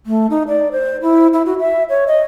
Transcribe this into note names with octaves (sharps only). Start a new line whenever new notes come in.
A3
D#4
D5
C5
E4
E4
F#4
E5
C#5
D#5